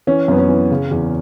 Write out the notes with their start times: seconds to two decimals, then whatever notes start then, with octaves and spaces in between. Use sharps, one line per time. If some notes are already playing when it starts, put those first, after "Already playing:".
0.07 E3 C#4
0.28 F#2 B3
0.38 C#4
0.49 E3
0.71 C#3
0.91 E2